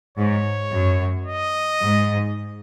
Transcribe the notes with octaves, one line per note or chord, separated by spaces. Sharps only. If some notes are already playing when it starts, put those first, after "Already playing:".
G#2 C#5
F#2
D#5
G#2